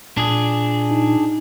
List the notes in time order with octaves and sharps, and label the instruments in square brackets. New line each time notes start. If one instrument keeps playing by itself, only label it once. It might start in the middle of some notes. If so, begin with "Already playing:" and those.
[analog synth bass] A#2 [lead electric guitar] D4 G#4
[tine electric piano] D#4